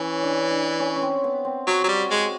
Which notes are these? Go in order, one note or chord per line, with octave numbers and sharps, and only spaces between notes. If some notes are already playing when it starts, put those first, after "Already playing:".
Already playing: E3 C#4
D4
D4
C#4
C#4
C4
B3
C4
F#3 F#4
F#3
G3
G#3